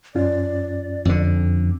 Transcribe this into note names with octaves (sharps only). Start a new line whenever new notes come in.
F#2 C#4 F4 D5
F2 D3